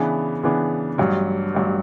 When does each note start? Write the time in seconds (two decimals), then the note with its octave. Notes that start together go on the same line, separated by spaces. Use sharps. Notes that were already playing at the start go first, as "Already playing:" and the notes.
Already playing: C#3 E3 B3 D4
0.43 C#3 E3 B3 D4
0.98 A1 G2 F#3
1.54 A1 G2 F#3